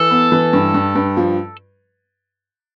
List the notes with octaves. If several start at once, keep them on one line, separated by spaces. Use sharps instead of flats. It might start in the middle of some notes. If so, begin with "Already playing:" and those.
Already playing: E3 A4
B3
E3
G2
G2
G2
F3